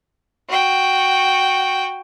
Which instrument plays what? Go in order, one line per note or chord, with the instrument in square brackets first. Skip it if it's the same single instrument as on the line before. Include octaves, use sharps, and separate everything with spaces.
[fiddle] F#4 G5